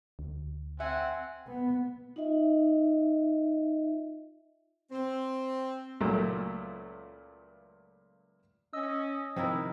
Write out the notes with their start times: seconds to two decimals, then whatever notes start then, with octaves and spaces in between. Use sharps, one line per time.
0.19 D2
0.80 C4 E5 F#5 G#5
1.48 B3
2.16 D#4 F4 D#5 E5
4.90 C4
6.01 C#2 A#2 F#3 A3
8.73 C#4 D#5 E6
9.36 C3 D#3 F3 A#3 E4